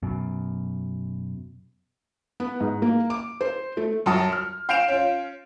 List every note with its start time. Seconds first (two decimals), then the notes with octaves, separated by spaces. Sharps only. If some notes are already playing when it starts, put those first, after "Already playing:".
0.03 F#2 B2
2.40 B3
2.60 G#2
2.82 A#3
3.10 D6
3.41 C5
3.77 A3
4.06 F#2 F#3 A5 D#6
4.32 F6
4.69 F5 G6 C7 D7 E7 F7
4.88 C#4 F4